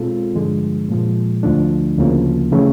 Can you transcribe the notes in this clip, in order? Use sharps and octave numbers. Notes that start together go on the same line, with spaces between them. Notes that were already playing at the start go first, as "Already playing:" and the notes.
Already playing: B2 G#3 C4 F4 A4
G2 D3 F3 G#3
A#2 F3 G#3
D2 D3 F3 A3 D4
D2 C#3 F3 A#3
C#3 E3 A3